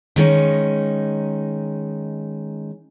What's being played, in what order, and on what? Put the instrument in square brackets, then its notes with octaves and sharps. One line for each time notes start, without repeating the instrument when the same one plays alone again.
[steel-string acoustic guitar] D#3 G#3 C#4 D#4